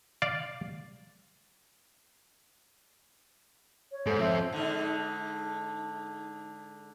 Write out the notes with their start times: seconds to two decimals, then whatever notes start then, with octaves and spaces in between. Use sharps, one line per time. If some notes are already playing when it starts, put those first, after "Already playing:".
0.22 D5 F5
3.92 C#5
4.06 G#2 A4 C5
4.20 F3 C4 E5
4.53 G#2 D3